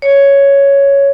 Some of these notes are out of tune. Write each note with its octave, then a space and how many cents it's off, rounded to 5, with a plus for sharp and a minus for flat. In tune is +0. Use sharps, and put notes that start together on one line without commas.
C#5 +5